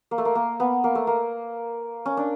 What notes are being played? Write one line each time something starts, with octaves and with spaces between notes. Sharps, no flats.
A#3
A3
A#3
A#3
B3
A#3
A3
A#3
C#4
D4